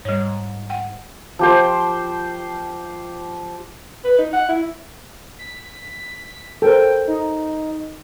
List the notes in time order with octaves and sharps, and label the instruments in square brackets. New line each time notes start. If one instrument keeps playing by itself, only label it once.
[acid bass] G#2 [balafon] G3 C#5
[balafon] F#5 G5
[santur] F3 G4 C5
[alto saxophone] B4
D#4
F#5
E4
[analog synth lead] B6
[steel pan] A4 A#4 C5 [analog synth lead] G5
[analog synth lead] D#4